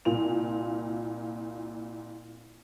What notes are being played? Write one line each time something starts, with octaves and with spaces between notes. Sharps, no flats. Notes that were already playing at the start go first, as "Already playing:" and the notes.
C2 A#2 F4 F7